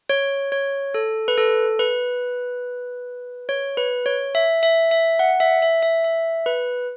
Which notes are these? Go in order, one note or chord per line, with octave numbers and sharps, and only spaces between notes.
C#5
C#5
A4
B4
A4
B4
C#5
B4
C#5
E5
E5
E5
F#5
E5
E5
E5
E5
B4